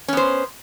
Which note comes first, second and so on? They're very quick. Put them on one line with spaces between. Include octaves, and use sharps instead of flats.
C#4 B3 C5